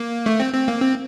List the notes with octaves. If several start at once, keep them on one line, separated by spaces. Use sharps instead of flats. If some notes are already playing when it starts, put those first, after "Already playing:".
Already playing: A#3
A3
C4
C4
A#3
C4